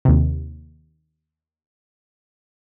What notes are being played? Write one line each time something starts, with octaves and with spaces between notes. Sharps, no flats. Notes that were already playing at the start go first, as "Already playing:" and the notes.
D#2 C3